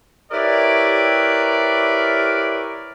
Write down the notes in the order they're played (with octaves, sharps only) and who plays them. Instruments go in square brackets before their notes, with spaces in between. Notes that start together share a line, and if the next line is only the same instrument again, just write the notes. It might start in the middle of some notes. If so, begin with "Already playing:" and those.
[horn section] E4 G4 A#4 B4 C#5 D5